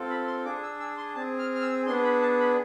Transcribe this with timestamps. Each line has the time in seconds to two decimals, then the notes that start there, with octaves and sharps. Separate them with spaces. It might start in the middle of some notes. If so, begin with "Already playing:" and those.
Already playing: C4 F4 A4
0.10 B5
0.27 C6
0.45 D4 G#4 D6
0.63 E6
0.80 E6
0.97 C6
1.15 C4 G#4 A5
1.39 F6
1.55 F6
1.62 E6
1.86 B3 D4 G#4 C6
2.04 B5
2.22 A5
2.39 B5